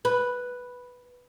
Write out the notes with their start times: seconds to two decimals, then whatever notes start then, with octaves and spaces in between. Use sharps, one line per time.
0.05 B4